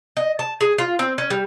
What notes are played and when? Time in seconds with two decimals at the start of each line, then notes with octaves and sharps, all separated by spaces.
0.17 D#5
0.39 A5
0.61 G#4
0.78 F4
0.99 C4
1.18 C#4
1.30 G3